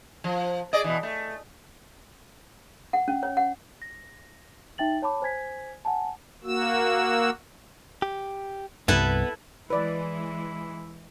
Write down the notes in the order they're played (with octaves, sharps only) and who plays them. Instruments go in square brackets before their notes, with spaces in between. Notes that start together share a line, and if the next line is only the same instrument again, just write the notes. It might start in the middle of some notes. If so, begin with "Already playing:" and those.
[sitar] F3
G#4 D5 D#5
B2 E3
A3
[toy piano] F#5
C#4
C#5
F#5
[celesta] A#6
D#4 E5 G5 A6 F#7
C#5 A5 B5 D6
C5 G#5 G#6 B6
F#5 G#5 A5
[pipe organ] A#3 F#4 E6
[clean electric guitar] G4
[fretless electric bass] C2 G2 [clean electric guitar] B3 [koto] E4 A4 B4
[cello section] E3 G#3 [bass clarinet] E4 [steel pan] B4 D5